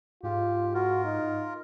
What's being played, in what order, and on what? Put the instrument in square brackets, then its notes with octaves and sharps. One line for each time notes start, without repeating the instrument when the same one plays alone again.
[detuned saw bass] G#2 [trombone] F4 [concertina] G4
[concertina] F4 A#4 [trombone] F#4
[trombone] D#4